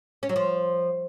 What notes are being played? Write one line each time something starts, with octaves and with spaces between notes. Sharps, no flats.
C#4
F#3
F3